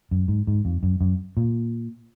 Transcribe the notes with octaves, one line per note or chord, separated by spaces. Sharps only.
F#2
G#2
G#2
F2
F#2
F#2
A#2